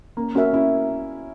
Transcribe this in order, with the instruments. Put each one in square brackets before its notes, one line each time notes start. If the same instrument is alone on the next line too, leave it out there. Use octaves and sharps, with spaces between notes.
[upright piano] A#3 [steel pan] C#4
[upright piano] C#4 [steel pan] F#4 A#4 E5
[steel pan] C#4 [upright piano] E4